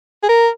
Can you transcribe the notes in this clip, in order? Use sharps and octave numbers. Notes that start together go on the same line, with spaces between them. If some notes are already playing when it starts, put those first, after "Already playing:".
G#4
A#4